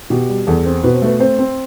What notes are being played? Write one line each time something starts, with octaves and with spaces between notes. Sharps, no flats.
B2 G4
G3
E2 A4
C4
B2 B4
C5
A3 B4
C4 C5
C4